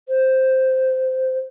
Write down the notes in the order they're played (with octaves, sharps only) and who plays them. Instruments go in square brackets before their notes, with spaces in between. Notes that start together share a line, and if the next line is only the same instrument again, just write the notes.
[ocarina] C5